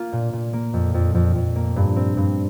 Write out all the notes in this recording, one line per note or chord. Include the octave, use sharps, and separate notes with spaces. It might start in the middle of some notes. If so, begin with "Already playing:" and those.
Already playing: A#3 F4
A#2
A#2
A#3
F2
F2
F2
F2
A#3
G2
C4
G2